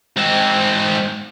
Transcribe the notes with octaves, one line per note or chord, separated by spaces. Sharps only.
G#2 C4